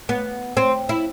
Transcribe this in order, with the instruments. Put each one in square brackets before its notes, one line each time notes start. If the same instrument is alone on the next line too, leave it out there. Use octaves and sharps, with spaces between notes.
[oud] B3
C4
E4